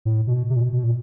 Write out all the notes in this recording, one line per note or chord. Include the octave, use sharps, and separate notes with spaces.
A2
B2
C3
A#2
B2
B2
A#2